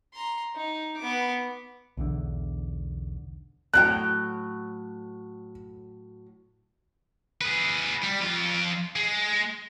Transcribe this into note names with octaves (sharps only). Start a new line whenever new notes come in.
A#5 C6
D#4
B3 D6
B1 E2 D3
A2 F#3 G5 F#6
G#4 B4
G3
F2 F4
G#3